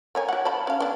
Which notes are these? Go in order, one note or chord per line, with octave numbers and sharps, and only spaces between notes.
A#3 C#5 G#5
F#4 F#5
D5 A5 B5
C#4 F5
B3 D4